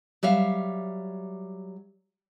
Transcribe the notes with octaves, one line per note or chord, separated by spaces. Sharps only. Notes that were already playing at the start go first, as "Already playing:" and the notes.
F#3 G3 E5 F5